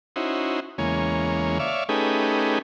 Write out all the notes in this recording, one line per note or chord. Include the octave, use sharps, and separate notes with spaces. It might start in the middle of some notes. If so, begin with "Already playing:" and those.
C#4 D#4 E4 F#4 C5
E2 C#3 G#3 A#3 C#5
C#5 D5 E5 F5
A3 C#4 D#4 G4 G#4 B4